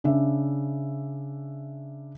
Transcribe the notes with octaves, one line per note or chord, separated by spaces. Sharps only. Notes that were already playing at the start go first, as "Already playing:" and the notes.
C#3 D4 E5